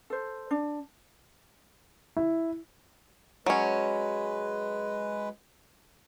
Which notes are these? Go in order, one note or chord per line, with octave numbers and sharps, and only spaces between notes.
A4 C5
D4
E4
F#3 G#3 C#4 B4